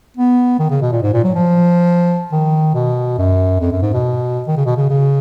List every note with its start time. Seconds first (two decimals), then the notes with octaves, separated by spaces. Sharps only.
0.17 B3
0.59 D#3
0.70 C#3
0.82 B2
0.92 A#2
1.03 G#2
1.13 A#2
1.24 F#3
1.35 F3
2.32 D#3
2.75 B2
3.18 F#2
3.60 F2
3.72 F#2
3.82 G#2
3.94 B2
4.48 D#3
4.57 C#3
4.66 B2
4.77 C#3
4.90 C#3